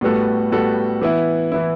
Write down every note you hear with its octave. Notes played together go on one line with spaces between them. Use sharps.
A2 G3 B3 F#4 A4
A2 G3 B3 F#4 A4
E3 B3 E4
E3 B3 E4